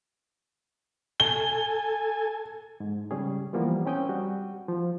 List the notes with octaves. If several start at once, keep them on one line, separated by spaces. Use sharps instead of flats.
A4 G#5 G7
G#2
C#3 G3 C#4 G#4
E3 F3 G3 A#3 B3
C4 C#4 G5 D#6 G6
G3 F#4
F3